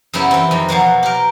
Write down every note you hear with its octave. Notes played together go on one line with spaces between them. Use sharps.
F#2 C#3 G3 B3 E4 G4
E3 C4
F2 D#3
B2 F3 F#3 F#4
G4 A#4